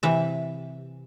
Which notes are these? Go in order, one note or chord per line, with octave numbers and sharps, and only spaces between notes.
C3 E3 E5